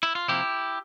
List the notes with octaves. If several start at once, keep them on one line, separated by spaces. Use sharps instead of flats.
E4
F4
C3 F3 A#3 E4 G4